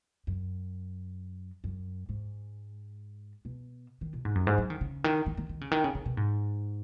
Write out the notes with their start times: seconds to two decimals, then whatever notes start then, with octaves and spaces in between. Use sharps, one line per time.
0.27 F#2
1.64 F#2
2.09 G#2
3.45 B2
4.01 D#3
4.13 B2
4.25 G#2
4.35 F#2
4.47 G#2
4.58 F#3
4.70 D#3
4.81 C#3
5.04 D#3
5.26 D#3
5.37 D#3
5.49 D#3
5.61 C#3
5.71 D#3
5.84 C#3
5.95 C#3
6.06 B2
6.17 G#2